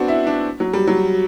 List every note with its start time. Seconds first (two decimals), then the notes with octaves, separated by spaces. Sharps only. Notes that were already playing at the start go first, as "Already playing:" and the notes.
Already playing: B3 C4 D4 F#4
0.08 E4
0.27 D4
0.60 F#3
0.73 G3
0.87 F#3